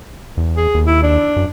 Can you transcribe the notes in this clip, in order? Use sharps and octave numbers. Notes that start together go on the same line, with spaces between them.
E2
G#4
D#2
E4
D4
F#2